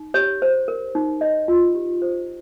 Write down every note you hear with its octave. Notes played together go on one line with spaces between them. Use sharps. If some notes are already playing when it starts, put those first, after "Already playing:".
Already playing: D#4
G4 C#5
C5
A#4
D#4
C#5 D#5
F4
G4
C5